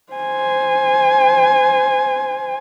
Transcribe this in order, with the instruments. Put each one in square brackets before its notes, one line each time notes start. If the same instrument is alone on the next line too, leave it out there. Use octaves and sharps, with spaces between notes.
[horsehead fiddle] C5 G#5